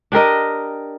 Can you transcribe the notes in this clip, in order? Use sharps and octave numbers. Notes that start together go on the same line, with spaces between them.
D4 G4 A#4 D#5